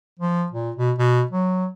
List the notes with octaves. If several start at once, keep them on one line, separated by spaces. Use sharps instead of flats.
F3
A#2
B2
B2
F#3